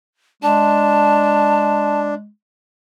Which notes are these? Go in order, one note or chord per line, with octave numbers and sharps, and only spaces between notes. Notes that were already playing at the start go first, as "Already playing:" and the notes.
G#3 D4 A5